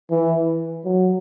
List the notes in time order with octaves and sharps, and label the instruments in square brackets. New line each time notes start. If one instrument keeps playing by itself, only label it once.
[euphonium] E3
F#3